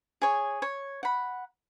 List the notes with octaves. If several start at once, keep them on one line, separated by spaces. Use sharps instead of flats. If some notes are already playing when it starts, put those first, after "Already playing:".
G#4 C#5
C#5
F#5 B5